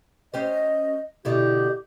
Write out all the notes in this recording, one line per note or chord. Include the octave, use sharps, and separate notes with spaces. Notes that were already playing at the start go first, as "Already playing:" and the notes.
C#4 G4 C5 D#5
B2 D3 E4 G4